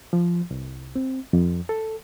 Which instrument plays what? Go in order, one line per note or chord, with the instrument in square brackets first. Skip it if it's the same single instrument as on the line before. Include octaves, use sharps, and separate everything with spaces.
[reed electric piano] F3
C2
C4
F2
A4